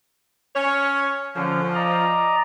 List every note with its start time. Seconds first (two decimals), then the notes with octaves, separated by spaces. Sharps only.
0.56 C#4 C#5
1.36 D3 F3 C#4
1.75 D5 D#5 A#5